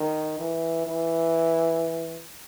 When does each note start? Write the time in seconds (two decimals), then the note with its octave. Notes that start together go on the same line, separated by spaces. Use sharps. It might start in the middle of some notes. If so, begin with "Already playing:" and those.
Already playing: D#3
0.39 E3
0.87 E3